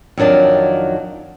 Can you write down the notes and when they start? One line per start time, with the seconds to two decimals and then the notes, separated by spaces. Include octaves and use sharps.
0.18 F2 D#3 F#3 D4 A5